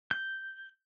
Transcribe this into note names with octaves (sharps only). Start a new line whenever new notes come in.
G6